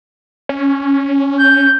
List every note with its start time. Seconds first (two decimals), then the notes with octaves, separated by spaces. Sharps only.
0.49 C#4
1.38 G6